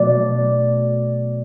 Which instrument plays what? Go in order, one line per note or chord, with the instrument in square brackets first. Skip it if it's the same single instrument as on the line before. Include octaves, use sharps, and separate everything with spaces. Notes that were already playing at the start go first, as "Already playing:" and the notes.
Already playing: [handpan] B2 F#3 A3 D5